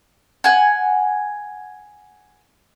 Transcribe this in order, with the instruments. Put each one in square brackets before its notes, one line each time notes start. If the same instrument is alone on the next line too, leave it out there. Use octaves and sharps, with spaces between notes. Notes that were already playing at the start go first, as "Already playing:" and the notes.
[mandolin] F#5 G#5